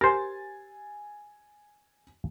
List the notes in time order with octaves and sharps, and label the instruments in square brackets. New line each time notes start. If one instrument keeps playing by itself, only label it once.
[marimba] G4 [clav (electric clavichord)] A#4 C5 [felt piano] G#5 A6